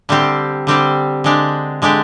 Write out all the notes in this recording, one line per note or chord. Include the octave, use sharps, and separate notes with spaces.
D3 G3 C4 G4
D3 G3 C4 G4
D3 G#3 D4 G4
D3 G#3 D4 G4